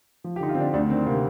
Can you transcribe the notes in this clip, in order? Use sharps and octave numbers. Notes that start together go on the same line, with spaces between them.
F3
G4
D3 D#4
F4
C4
D3 D4
D2 D4
D#3 C4
C3 A#3